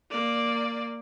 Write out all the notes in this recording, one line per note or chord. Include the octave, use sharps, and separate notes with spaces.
A#3 D5